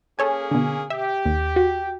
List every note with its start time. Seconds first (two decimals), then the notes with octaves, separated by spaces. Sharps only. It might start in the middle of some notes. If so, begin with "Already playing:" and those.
0.19 A#3 C#4 G#4 A4 C#5 G#5
0.51 B2 D3
0.90 G4 E5
1.25 D#2
1.56 F#4